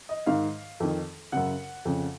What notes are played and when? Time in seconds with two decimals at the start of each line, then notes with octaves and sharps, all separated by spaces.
0.09 D#5
0.26 G#2 D#3 F5
0.80 F2 D#3
1.32 F#2 C#3 F#5
1.85 F2 C#3